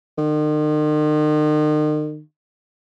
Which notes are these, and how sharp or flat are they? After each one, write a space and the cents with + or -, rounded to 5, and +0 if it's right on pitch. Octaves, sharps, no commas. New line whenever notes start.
D#3 -40